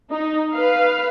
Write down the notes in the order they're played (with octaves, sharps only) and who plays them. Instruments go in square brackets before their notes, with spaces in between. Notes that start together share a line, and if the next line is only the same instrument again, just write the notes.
[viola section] D#4
B4 F5